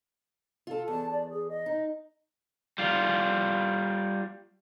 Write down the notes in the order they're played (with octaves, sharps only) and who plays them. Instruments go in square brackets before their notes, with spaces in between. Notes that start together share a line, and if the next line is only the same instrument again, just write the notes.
[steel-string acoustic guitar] F4 A4
[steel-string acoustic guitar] E2 [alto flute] A5
[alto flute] D5
G#4
D#5
[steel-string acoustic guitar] D#4
[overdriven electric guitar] G3 F4